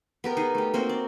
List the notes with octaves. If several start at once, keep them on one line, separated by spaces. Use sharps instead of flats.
B3 G4 A#4
D#4 G#4
A3 G4
A#3 C4 F#4 A#4
D5